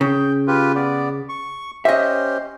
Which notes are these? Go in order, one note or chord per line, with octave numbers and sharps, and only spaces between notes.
C#3 G5
F4 G4 B4
B3 D5
C#6
C#4 G4 C5 D#5 E5